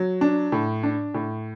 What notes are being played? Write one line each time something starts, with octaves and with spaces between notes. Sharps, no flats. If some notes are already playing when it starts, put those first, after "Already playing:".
Already playing: F#3
D4
A2
D4
A2